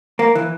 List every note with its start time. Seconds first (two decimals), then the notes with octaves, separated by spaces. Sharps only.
0.19 A#3
0.35 E3